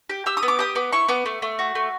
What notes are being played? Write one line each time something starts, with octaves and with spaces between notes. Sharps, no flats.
G4
G4 E6
D#6
B3
D6
G4 D#6
B3 D6
E4 C#6
B3 D6
A3
A3
F#4
A3